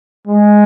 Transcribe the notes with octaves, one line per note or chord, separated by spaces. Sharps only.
G#3